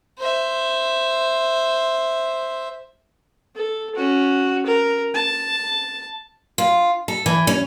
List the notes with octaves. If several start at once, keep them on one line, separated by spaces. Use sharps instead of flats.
C5 E5
A4
C#4 F#4
A#4
A5
F4
A4
E3
C#4